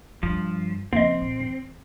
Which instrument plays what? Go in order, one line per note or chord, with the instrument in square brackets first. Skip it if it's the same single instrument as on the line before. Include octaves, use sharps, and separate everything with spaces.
[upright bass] G2 [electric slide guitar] F3
[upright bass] C#3 F3 [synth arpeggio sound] A#3 D#5 [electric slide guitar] C4
[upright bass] A#2
E2